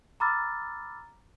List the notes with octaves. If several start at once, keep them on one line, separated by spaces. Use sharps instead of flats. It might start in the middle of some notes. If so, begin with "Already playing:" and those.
A#5 B5 D6 E6 F6 A6